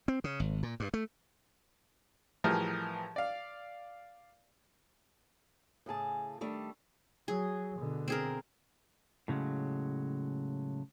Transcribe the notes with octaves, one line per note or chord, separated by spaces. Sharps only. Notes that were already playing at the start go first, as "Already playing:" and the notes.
C4
C#3
G#1
A#2
G2
A3
A2 E3 F3 G3 G#4 A#4
D5 F5
A2 C#3 G#4 A5
D#3 G3 A3 D4
F#3 G#4
B2 D3
C4 G#4 A#4
A2 C#3 F#3 G#3